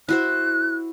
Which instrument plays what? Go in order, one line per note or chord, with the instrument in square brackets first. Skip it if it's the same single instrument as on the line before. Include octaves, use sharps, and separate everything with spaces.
[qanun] E4 F#4 C5 [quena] F#6